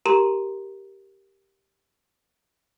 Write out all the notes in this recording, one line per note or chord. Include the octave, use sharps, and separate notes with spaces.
G4 A#4 A#5 C6 E7